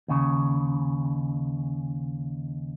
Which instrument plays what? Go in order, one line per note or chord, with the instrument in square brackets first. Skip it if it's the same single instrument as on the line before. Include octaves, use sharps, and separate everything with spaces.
[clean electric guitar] D#2 C#3